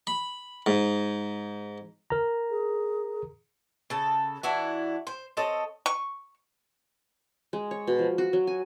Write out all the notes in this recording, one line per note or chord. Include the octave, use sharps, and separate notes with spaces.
B5
G#2
A#4 A#5
G#4
C#3 A4
E3 D4 E4 F#4
C5
C4 A4 C#5 D#5
C#6
G#3
C#5
B2
F3
F#4
F#3
G#5